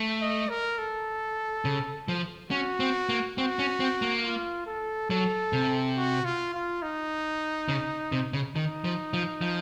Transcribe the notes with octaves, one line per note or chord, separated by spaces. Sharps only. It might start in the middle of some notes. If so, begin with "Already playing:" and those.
Already playing: A3
D#5
A#4
A4
C#3
F3
C#4 F#4
C4
A#3
C4 F#4
C#4
C4
A#3
F4
A4
F#3 A4
C3
F#4
F4
F4
D#4
C#3
C3
C#3
D#3 D#4
F3
F3
F3